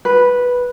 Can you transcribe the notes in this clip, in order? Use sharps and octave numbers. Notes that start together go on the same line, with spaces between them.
B4